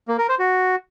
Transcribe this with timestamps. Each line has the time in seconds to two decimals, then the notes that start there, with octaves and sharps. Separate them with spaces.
0.08 A#3
0.18 A#4
0.29 C5
0.39 F#4